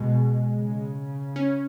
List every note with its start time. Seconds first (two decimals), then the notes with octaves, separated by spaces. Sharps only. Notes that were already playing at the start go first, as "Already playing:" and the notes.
Already playing: B2 G#3
0.57 C#3
1.36 C#4